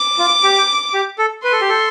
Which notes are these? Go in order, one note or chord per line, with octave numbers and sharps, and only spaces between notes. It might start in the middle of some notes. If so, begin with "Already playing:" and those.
Already playing: D6
F4
G4
G4
A4
B4 C6
A4
G4
A4